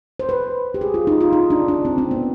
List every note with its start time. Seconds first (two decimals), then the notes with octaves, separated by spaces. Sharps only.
0.19 C5
0.29 B4
0.74 G4
0.81 G#4
0.94 F4
1.07 D#4
1.21 F4
1.33 D#4
1.50 D4
1.68 D4
1.85 C4
1.98 C4
2.11 B3